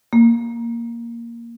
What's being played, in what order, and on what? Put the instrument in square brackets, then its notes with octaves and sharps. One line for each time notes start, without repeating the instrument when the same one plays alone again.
[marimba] A#3